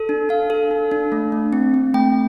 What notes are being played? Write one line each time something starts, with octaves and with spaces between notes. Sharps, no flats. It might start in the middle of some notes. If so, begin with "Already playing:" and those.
Already playing: A4
D4
D4 F5
A4
D4
D4
A3
A3
C4
C4
A3 G5